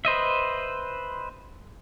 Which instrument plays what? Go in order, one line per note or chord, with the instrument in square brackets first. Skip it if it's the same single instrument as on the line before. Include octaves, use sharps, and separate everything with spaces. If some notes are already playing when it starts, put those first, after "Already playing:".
[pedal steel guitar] B4 C5 D#5 E5